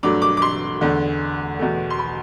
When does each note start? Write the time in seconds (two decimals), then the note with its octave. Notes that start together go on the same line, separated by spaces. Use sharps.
0.03 G2 F#3 A3 D6
0.22 D6
0.37 D6
0.42 C6
0.81 E2 D3 A3
1.59 E2 B2 A3
1.90 C6
1.99 B5